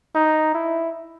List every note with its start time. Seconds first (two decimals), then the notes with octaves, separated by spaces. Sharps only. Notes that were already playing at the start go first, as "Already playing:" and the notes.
0.15 D#4
0.54 E4